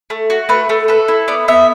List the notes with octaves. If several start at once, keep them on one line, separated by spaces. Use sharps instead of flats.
A3
F#4
A3 B4
A3
A4 B4
E4
B3 D5
B3 E5